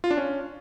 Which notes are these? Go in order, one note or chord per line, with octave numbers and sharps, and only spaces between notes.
F4
D4
C#4